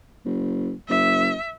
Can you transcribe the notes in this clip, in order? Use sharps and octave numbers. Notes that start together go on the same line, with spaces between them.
F#1
F#1 E5